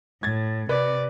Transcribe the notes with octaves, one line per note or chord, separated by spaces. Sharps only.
A2 G#6 A6
C3 B4 D5